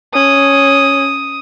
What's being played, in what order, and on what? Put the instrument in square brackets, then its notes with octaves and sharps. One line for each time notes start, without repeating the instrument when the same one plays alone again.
[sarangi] C#4 [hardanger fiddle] D#6